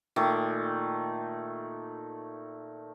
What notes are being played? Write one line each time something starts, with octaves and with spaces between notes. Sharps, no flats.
A#2 D#3 A3 D6